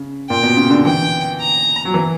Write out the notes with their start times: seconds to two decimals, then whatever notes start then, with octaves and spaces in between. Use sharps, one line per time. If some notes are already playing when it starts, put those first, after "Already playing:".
Already playing: C#3
0.30 A#2 G5
0.43 B2
0.57 C#3
0.70 D3
0.84 E3 G5
1.39 A#5
1.85 F#3
1.94 E3